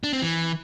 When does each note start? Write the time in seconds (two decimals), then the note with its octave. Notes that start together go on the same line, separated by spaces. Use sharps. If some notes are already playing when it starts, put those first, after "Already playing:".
0.04 D4
0.13 C4
0.22 E3